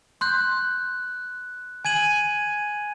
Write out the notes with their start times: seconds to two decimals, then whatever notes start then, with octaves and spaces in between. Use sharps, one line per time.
0.21 C6 F#6 G6
1.85 G#5 G#6 D#7 F#7